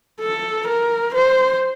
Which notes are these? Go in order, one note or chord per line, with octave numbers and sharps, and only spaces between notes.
A4
A#4
C5